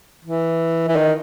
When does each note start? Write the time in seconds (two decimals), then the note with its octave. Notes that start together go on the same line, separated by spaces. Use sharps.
0.25 E3
0.88 E3
0.96 D#3